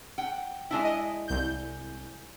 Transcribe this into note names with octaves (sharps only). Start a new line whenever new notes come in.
F#5 G5
G#3 D4 E4
D#5
C2 G6